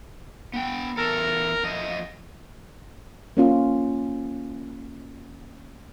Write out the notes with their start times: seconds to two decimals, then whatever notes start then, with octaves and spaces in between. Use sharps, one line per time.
0.54 B3 G5
0.97 E2 A4 A#4
1.63 F2 A3 D#5
3.37 A#3 C#4 F4